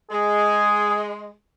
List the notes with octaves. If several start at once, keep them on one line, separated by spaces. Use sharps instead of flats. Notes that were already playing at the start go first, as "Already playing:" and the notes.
G#3 G#4